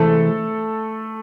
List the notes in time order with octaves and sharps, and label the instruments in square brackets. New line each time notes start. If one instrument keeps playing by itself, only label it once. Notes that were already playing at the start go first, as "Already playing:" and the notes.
Already playing: [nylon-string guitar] C3 E3 G#3 C#4 [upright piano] A3 A4